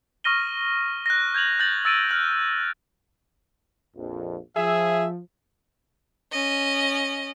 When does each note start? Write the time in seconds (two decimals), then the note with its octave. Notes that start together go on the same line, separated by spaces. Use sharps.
0.24 C#6 D#6 F6 A#6 D#7 G7
1.06 F#6 A#6
1.34 G6 G#6 F7 F#7
1.59 F#6 G6 A6 F#7
1.85 E6 A6 D7 D#7
2.09 F6 F#6 F#7
3.95 A#1 F2
4.56 F3 G#4 E5
6.32 C#4 D#5